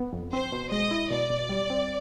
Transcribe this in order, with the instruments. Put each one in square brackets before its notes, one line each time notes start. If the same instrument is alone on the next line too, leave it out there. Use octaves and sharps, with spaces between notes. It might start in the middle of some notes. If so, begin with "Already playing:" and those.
Already playing: [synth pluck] B3
F2
[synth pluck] C4 [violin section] C5
[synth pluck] B2
[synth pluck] G#3 [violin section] D#5
[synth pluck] E4
[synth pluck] B2 [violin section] D5
[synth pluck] B2
G3
C4